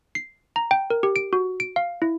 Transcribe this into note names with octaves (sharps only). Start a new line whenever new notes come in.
C7
A#5
G5
A#4
G4
D7
F#4
D7
F5
E4